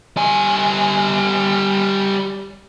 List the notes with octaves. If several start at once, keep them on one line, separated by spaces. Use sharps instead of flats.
G3 G#5